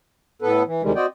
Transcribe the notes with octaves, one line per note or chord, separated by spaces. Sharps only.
A2 B3 A4 B4
E3
D2 C3 D#3 G3 G#3
C4 F#4 D5 D#5 G5